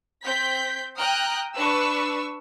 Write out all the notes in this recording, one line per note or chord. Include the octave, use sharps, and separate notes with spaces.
C4 G6 B6
G5 A#5 D#6 F6 F#6
D4 B4 C#6 E6